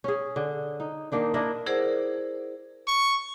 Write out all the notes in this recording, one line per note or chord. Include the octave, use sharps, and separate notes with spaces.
C#4 G#4
D3
D#4
D#3 A#3 D4 D#4
D4 E4 A#4 D#5
E4 G#4 A#4 C5 D5 F#5
C#6